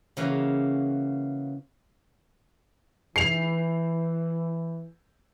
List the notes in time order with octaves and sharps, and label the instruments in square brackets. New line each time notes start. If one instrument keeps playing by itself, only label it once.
[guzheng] C#3 E3 A#3 F#4
[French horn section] E3 [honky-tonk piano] C7 F7